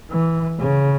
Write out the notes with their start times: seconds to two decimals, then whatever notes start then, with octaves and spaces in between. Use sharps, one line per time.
0.11 E3
0.59 C#3